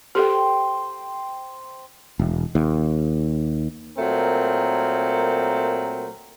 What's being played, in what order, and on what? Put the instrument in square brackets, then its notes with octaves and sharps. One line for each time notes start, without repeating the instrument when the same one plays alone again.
[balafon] G4 A4 [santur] C5 G5
[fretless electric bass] E1
D#2
[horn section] A#2 F#3 A3 C4 A#4